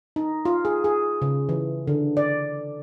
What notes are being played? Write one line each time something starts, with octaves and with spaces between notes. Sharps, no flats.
D#4
F4
G#4
G#4
C#3
E3
D3
D5